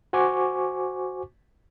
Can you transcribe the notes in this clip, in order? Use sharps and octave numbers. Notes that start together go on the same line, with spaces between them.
F#4 C5 G#5 C#6 D6